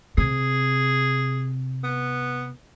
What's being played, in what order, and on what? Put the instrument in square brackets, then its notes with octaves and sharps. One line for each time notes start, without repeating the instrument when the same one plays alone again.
[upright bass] C3 [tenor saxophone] G#4
[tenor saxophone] B3